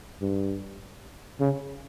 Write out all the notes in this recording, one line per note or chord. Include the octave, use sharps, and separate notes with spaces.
G2
C#3